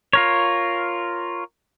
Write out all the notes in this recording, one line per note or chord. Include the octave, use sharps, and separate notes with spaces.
F4 A#4 C#5